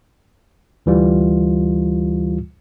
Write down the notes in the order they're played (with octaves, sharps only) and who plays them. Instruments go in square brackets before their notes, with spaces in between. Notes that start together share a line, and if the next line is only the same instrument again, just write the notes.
[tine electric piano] D2 E3 G3 F4